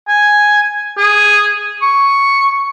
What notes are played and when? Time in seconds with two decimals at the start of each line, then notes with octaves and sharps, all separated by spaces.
0.08 G#5
0.97 G#4
1.82 C#6